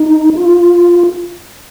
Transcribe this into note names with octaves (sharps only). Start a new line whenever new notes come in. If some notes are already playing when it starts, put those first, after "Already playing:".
Already playing: D#4
F4